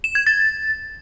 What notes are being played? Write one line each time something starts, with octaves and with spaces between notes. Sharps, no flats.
E7
G#6
A6